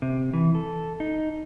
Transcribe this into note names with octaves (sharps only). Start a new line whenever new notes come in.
C3
E3
A4
D#4